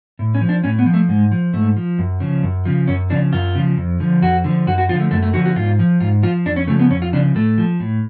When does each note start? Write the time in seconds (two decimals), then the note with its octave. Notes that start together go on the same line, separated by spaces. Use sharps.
0.19 A2
0.34 C#4
0.41 F3
0.49 D4
0.64 A2 C#4
0.79 B3
0.86 F3
0.94 A3
1.08 G#2 G#3
1.32 F3
1.53 G#2 A3
1.77 F3
1.98 F#2
2.20 C#3 F3
2.43 F#2
2.65 C#3 F3
2.88 F#2 C#4
3.10 C#3 F3 D4
3.33 F#2 F4
3.55 C#3 F3
3.77 F2
4.00 D3 F3
4.22 F2 F#4
4.44 D3 F3
4.67 F#2 F#4
4.78 F#4
4.89 D3 F3 F4
5.00 A3
5.11 F#2 A3
5.23 A3
5.33 D3 F3 F#4
5.45 F#4
5.56 G#2 F4
5.79 F3
6.00 G#2 F4
6.23 F3 F4
6.46 F2 D4
6.56 C#4
6.67 C#3 A3
6.71 F3
6.80 B3
6.90 F2 C#4
7.02 F4
7.13 C#3 F3 D4
7.35 A2 A3
7.58 F3
7.80 A2